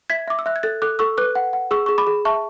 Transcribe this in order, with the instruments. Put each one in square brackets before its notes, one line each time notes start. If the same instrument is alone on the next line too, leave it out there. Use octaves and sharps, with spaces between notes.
[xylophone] E5 G#6 B6
E5 D6
E6
E5 F#6
G#6
A4 F#6 A6
A4 D6 F#6
A4 C#6 E6
B4 D6 F#6
F#5
F#5
G#4 C#6 E6
G#4 C#6
B5 D6
G#4
E5 A5 C#6